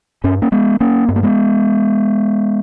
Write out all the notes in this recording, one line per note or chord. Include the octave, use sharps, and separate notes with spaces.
G2 C#4
A#3 C#4
G#3 B3
A#3 C#4
G2 B3
A#3
G#3 B3